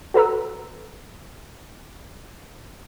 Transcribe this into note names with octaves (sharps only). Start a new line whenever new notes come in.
F#4 A4 B4 A#5 E6